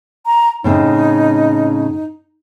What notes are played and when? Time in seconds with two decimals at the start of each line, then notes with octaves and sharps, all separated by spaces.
0.26 A#5
0.64 A2 C#3 C4 D#4